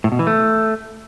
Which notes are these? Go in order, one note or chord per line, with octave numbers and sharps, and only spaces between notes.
A2
B2
E3
A3